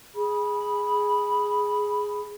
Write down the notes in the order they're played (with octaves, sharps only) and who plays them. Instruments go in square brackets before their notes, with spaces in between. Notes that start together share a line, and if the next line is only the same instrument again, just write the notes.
[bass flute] G#4 [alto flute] B5